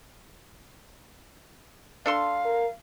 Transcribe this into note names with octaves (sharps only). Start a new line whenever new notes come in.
D4 A4 F5 C6
A#4